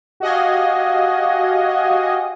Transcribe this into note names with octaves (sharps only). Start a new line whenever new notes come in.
F#4 G4 D#5 F5 G#5